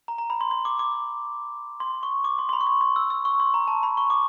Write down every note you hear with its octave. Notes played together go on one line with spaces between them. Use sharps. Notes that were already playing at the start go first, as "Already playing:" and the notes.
A#5
A#5
B5
C6
C6
D6
D6
C6
C#6
D6
C6
C6
B5
C#6
C6
C6
E6
E6
C#6
C6
A#5
A5
B5
C#6
D6